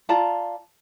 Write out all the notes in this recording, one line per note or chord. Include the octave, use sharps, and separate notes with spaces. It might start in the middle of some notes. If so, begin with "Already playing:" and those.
F4 D5 A5 A#5